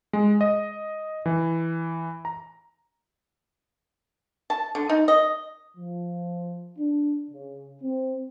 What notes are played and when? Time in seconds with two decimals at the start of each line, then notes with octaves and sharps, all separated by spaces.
0.13 G#3
0.41 D#5
1.26 E3
2.25 A#5
4.50 A5
4.75 D3
4.89 D#4
5.08 D#5
5.77 F3
6.78 D4
7.30 C#3
7.81 C4